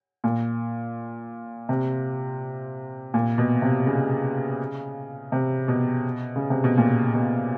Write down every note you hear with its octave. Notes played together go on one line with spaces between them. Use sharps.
A#2
C3
A#2
B2
C3
C#3
C3
B2
C#3
C3
B2
A#2
B2